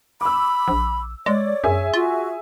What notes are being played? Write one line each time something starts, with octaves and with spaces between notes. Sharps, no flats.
B5 D6 E6
A#1
G#3 C#5 D5
F#2 G#4 E5 G#5
F4 F#4